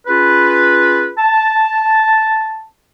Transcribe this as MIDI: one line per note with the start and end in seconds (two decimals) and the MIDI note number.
0.07 1.11 61
0.07 1.11 65
0.07 1.11 68
0.07 1.11 71
1.18 2.65 81